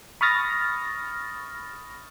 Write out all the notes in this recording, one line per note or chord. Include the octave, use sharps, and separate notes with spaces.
B5 C#6 D#6 F6 A6 A#6